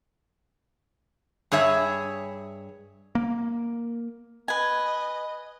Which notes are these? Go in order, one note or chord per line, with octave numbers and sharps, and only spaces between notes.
G2 G#4 C#5 E5
A#3
B4 D#5 G#5